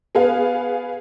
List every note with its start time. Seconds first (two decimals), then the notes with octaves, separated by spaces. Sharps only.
0.15 B3 G#4 B4 F5